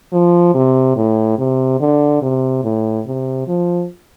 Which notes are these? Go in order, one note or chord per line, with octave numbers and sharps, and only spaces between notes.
F3
C3
A2
C3
D3
C3
A2
C3
F3